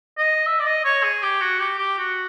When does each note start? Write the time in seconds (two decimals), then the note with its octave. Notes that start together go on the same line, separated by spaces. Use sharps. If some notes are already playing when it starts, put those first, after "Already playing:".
0.18 D#5
0.47 E5
0.60 D5
0.66 D#5
0.85 C#5
1.03 G#4
1.23 G4
1.42 F#4
1.60 G4
1.78 G4
1.98 F#4